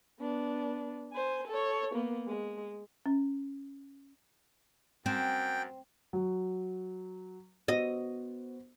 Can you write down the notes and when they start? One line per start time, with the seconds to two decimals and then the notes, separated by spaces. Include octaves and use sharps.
0.19 B3 D4
1.13 C5 G#5
1.47 A4 C#5
1.94 A#3 B3
2.27 G#3
3.06 C#4
5.06 F#2 C4 G5
6.13 F#3
7.68 B3 F#4 C5 D#5